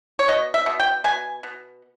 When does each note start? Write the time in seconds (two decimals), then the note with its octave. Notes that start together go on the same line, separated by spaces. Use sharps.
0.19 C#5
0.28 B2 D#5
0.54 E5
0.66 B2
0.80 G5
1.04 B2 G#5
1.43 B2